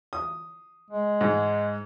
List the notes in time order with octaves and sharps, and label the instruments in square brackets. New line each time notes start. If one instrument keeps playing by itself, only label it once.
[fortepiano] D#6
[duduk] G#3
[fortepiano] G#2